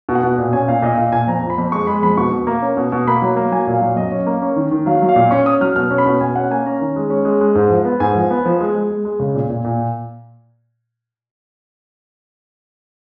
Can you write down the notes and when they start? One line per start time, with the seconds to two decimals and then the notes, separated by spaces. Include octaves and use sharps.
0.09 B2
0.15 F#5
0.23 B2
0.38 A#2
0.53 C#4 G#5
0.68 A#2 F5
0.82 A#2 D#5
0.98 A#2 F5
1.12 A#2 G#5
1.28 F2 A#5
1.43 F3
1.50 B5
1.58 F2
1.72 G#3 C#6
1.87 G#3 B5
2.02 F2 B5
2.17 B2 C#6
2.32 B2
2.47 A#3
2.62 C#4
2.77 B2
2.92 B2
3.07 A#3 B5
3.22 F#3
3.36 A#3
3.51 F#3 G#5
3.67 A#2
3.74 F5
3.81 F#3
3.96 F#2 D#5
4.12 C#4
4.26 A#3
4.42 C#4
4.56 D#3
4.71 D#3
4.86 F#3 F5
5.02 F#3
5.09 F5
5.16 A#2
5.31 C#4 C#6
5.46 C#4 D#6
5.61 F#3 F6
5.76 B2 F6
5.91 C#4
5.98 B5
6.06 B2
6.21 B2 G#5
6.35 C#4 F#5
6.51 A#3 G#5
6.66 C#4 A#5
6.81 D#3
6.96 G#3
7.10 C#4
7.25 G#3
7.41 G#3
7.55 G#2
7.70 F3
7.85 B3
8.00 G#2 G#5
8.15 F3
8.31 B3
8.45 F3
8.60 G#3
8.75 G#3
8.90 G#3
9.05 G#3
9.20 C#3
9.35 A#2
9.50 A#2
9.64 A#2